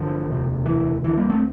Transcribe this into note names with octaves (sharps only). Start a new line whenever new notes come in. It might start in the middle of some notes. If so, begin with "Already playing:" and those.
Already playing: A1 G2 D3 F3
E1 D2 C3
E3
D2 D3 E3
G3 A#3
A3 C4